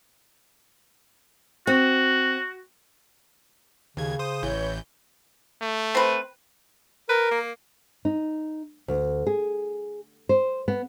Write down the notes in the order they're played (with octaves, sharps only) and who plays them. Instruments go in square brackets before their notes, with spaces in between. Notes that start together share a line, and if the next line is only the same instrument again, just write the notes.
[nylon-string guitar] C4 [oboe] F#4
[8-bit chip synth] D#2 G#6 [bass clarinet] C#3
[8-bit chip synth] C5 D#6
[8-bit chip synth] A1 E3 G6 [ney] C#5
[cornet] A3
[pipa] C4 B4
[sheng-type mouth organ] A#4 [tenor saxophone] B4
[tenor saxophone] A#3
[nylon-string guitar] D#4
D2
G#4
C5
B3